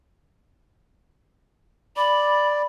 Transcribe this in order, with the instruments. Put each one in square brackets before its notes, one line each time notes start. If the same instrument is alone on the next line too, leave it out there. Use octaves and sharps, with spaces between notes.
[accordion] D5 [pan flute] B5